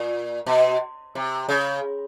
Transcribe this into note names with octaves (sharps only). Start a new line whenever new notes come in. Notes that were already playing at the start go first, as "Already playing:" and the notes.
Already playing: A#2
B2
C3
C#3